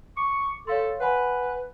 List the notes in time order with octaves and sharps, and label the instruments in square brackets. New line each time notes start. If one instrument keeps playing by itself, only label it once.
[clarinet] C#6 [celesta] D6
[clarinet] A4 [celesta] C#5 F5 C6
[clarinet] B4 [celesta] F#5 G#5 B5